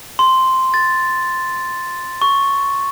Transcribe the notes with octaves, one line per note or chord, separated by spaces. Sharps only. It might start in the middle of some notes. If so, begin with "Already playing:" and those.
C6
A6
C#6